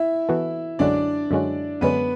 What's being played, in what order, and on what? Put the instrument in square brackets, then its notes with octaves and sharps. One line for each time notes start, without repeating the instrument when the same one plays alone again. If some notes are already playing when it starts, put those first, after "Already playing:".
Already playing: [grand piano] E4 E5
[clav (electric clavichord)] E3 B3 F#4 A4
[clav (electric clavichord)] F#2 D3 G#3 C#4 F#4 [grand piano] D4 D5
[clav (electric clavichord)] F#2 D3 G#3 C#4 F#4
[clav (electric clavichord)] F#2 D3 G#3 C#4 F#4 [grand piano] B3 B4